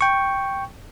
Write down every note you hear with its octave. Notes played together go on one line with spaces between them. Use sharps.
G5 C#6